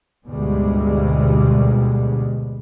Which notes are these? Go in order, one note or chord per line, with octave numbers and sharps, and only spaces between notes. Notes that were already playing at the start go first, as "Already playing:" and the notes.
D2 G#2 B2 G3 G#3